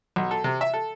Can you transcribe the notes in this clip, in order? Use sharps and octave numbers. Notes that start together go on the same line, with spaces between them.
B1
A4
C3
E5
A4